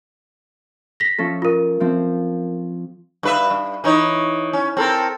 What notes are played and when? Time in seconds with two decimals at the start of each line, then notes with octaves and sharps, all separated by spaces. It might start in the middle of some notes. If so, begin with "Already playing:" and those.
1.00 A#6 B6
1.18 F3 C#4 A4
1.42 F4 A#4
1.80 F3 C4
3.23 G2 B4 E5
3.50 G2
3.84 E3 D#4 C#5
4.53 C#4
4.77 C4 A4 A#4